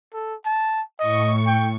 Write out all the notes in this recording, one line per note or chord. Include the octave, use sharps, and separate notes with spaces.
A4
A5
A2 D#5 C#6
G5